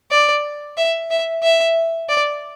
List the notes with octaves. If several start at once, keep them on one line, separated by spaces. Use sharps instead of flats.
D5
E5
E5
E5
D5